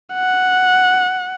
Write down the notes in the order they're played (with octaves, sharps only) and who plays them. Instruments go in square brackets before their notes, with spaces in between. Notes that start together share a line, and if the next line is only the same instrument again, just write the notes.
[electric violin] F#5